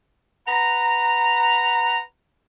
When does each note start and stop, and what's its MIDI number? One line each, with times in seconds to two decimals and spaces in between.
0.48 2.00 71
0.48 2.00 78
0.48 2.00 82